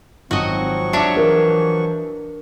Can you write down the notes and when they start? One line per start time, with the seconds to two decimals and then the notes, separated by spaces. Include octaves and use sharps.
0.31 G#1 F3 F#3 C4 F#4 D#5 C#6
0.93 D4 C#5 E5 A5 D6
1.16 E3 A#4